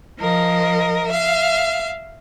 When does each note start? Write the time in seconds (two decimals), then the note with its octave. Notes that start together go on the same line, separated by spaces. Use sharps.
0.19 F3 A#4 D#5
1.06 E5 F5